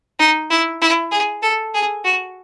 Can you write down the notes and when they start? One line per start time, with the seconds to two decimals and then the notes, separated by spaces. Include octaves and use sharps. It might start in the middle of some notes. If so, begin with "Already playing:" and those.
0.19 D#4
0.50 E4
0.82 E4
1.12 G#4
1.43 A4
1.74 G#4
2.05 F#4